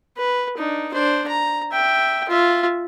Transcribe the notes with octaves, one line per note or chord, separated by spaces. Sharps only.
B4
D4 D#4
D4 C5
A#5
E5 G5
F4 E5